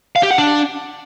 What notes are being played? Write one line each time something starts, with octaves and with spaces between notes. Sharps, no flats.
F5
G4
F#5
D4